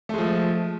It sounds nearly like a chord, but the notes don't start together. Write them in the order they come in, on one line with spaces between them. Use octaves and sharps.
A3 G#3 F3